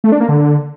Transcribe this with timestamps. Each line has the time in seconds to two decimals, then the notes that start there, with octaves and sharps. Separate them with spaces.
0.04 A3
0.12 D4
0.20 A#3
0.29 D3